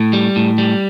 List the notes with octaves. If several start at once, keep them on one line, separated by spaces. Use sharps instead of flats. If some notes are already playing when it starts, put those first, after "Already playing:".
Already playing: A2
G3
A2
G3